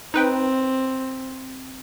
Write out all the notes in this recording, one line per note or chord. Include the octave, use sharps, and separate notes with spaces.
C4 D#4 B4 G5